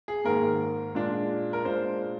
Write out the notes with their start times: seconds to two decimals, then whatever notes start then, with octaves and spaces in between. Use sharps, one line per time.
0.08 G#4
0.24 G#2 D#3 A#3 A#4
0.95 A#2 G#3 D4
1.53 A#4
1.65 A#2 G#3 D4 C5